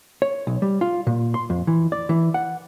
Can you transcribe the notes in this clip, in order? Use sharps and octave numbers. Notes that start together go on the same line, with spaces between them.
C#5
B1
G3
F4
A#2
C6
F2
E3
D5
E3
F#5